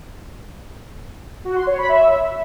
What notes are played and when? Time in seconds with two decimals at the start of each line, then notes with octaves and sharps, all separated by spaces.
1.45 F#4
1.56 C6
1.67 C#5
1.78 B5
1.89 E5